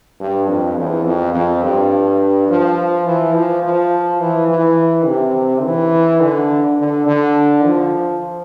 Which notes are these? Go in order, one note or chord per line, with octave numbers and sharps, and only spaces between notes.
G2
F2
E2
F2
F2
G2
F3
E3
F3
F3
E3
E3
C3
E3
D3
D3
D3
F3